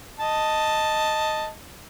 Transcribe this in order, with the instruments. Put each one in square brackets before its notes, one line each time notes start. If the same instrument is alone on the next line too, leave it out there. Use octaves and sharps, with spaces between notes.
[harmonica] D#5 A5